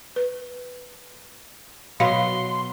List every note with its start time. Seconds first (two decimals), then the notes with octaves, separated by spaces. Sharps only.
0.16 B4
2.00 B2 F#3 B3 F5 C6